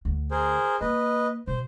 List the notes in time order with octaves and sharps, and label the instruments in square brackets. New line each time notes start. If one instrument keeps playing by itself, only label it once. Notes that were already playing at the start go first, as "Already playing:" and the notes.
[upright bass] D2
[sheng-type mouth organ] G#4 A#4 C5
[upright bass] A#3 [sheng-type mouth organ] B4 D#5
[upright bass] B2 [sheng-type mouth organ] C5